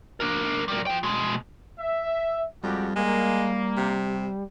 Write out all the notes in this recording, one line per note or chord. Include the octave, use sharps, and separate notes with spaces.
D4 A#4
G3 A#4
F3 G5
B2 G#3
E5
F2 G3 G#3 F#4 G4
G#3 A#3
C3